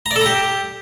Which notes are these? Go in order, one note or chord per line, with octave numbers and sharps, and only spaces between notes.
A#5
D5
A4
A#5
G4